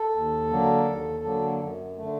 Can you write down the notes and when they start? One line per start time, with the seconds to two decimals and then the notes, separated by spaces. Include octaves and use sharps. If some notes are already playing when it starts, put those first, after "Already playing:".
Already playing: A4
0.15 D#2
0.50 D3 F#3 A#3
0.87 D#2
1.25 D3 F#3 A#3
1.61 F#2
1.97 D3 A3